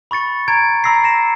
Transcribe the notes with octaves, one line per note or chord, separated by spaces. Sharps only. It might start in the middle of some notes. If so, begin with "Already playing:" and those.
B5 C#6 A6 C#7
A#5 G#6 D7
A#5 B5 E6 A#6 C7
A#6 C#7 E7